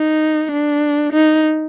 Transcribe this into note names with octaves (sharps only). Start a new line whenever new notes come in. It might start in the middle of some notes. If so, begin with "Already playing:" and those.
Already playing: D#4
D4
D#4